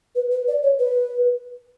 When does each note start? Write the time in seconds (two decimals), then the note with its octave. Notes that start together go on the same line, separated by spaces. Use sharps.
0.15 B4
0.31 B4
0.48 D5
0.63 C#5
0.79 B4